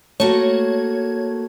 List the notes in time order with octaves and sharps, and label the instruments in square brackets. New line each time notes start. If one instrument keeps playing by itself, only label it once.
[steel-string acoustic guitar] A3 A#3 F#4 [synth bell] C#5